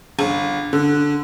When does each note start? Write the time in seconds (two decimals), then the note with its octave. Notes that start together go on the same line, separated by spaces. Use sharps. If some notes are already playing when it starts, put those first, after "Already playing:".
0.19 G1
0.73 D3